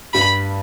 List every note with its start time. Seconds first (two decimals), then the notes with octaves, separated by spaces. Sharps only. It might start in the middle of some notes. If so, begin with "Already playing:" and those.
0.13 G2 G3 B5